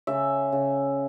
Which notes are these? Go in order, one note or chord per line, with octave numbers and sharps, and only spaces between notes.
C#3 E5
C#3